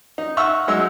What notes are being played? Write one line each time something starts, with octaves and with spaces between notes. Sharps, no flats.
D#4
E5 F#5 C#6 E6 F6
F#3 G#3 D#4 E6